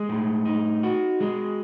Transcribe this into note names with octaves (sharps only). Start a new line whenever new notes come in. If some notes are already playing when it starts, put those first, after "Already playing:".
Already playing: G#3
A2
D#4
F#4
G#3